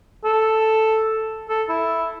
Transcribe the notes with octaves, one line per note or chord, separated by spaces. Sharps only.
A4
A4
E4